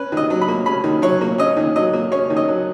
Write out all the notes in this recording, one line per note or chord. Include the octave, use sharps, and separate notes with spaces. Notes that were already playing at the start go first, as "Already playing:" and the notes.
Already playing: C#4 B4
D#3 D#5
F#3
B5
A#3
C#4 B5
D#3
F#3 C#5
A#3
C#4 D#5
D#3
F#3 D#5
A#3
C#4 C#5
D#3
D#5
F#3